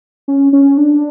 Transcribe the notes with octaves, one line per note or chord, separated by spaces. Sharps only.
C#4
C#4
D4